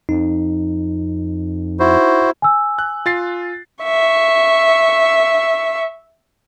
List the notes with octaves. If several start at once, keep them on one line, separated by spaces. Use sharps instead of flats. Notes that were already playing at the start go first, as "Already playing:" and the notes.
F2 D#4
E4 F#4 C5
G#5 E6
F#6
F4 A6 C7
E5 C#6